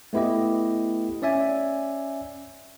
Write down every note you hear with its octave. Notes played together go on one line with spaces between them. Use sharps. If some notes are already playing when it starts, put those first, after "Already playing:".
A3 B3 E4 G4 D#5
C#4 D5 E5 G#5